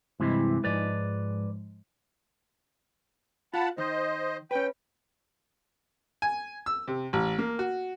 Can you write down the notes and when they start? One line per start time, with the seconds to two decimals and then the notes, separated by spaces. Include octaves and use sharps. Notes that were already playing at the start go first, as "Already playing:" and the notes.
0.20 G2 C3 E3 G#3 E4
0.64 G#2 F3 G#3 B4 D5
3.54 F4 F#5 A5 B5
3.78 D#3 C5 D#5
4.51 C#4 B4 G5
6.22 G#5
6.66 E6
6.88 C3
7.13 A1
7.38 A#3
7.59 F#4